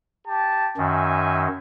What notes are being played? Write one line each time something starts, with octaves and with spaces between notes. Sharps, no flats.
G4 A5
F#2 D#3 E5 G#5